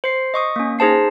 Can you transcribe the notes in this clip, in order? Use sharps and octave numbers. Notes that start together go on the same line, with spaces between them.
C5 C7
D#5 C#6 D#6
A#3 C#4
D#4 G#4 C5 A5 C7